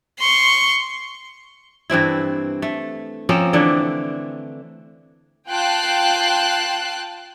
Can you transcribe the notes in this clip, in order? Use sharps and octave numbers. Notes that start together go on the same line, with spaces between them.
C6 C#6
G2 E3 C4 E4
A3
F3 A#3 C4 C#4
D3 E3 A3 D4
F4 G5 A5 F#6 C7